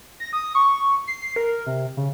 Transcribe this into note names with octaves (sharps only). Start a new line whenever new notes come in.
A#6
D#6
C#6
C7
A#4
C3
C#3